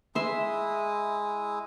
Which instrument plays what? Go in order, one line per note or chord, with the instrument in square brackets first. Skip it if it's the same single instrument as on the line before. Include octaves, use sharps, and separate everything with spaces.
[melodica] G#3 E4 D#6 [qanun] E5 C6